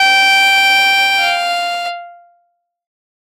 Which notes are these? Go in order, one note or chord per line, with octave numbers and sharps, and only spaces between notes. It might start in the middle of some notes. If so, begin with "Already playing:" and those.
Already playing: G5
F5